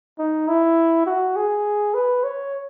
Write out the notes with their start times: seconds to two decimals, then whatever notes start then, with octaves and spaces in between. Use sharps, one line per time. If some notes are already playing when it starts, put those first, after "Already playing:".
0.19 D#4
0.48 E4
1.07 F#4
1.36 G#4
1.94 B4
2.24 C#5